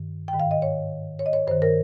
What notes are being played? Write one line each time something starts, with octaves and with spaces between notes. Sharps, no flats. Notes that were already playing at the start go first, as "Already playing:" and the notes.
Already playing: G2 D#3
G5
G#2 D#3
F5
D#5
C#5
C#5
D#5
C#5
G2 D#3 C5
A#4